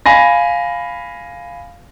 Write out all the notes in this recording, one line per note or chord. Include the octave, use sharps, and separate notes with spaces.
F5 G#5 B5 A#6